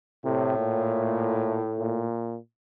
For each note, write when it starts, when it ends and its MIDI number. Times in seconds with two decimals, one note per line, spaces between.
0.25 2.03 45
0.25 0.58 48
0.59 1.61 46
1.79 2.38 46